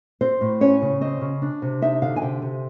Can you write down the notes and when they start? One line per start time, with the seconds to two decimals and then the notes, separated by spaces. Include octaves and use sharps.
0.21 C4 C5
0.41 A2
0.61 C#4 C#5
0.82 C#3
1.01 C4 D#5
1.21 C#3
1.42 D4
1.62 C3
1.82 D#4 E5
2.02 D3 F5
2.16 G#5
2.22 C3 G5
2.42 C3